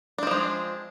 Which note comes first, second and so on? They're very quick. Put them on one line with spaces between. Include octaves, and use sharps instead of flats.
D4 C4 F3 G#3